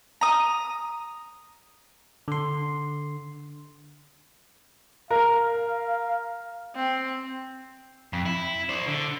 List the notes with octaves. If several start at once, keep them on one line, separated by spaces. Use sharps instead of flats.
A#5 D#6
D3 C6
A#4 F5
C4
F2
E4
C5 D5
D3